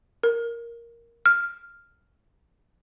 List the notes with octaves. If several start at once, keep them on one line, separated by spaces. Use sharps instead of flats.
A#4
F6